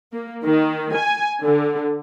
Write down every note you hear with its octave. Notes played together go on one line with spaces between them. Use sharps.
A#3
D#3
G#5
D3